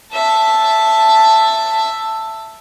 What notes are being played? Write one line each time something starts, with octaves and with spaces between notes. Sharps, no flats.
E5 A5